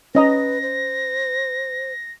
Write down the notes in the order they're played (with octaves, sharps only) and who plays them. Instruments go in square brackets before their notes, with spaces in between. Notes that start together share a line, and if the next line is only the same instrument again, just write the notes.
[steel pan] C#4 D#5 A#5 [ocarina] B4 [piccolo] A#6
[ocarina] C5